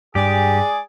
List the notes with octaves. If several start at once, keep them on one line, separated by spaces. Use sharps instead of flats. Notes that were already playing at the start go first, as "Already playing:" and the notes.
G2 G#3 G4 G#4 D5